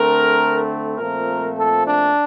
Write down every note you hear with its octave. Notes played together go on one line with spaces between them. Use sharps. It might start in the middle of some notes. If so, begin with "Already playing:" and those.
Already playing: D3 A3 C4 A#4
A#2 F3 A3 C4 A#4
A4
D4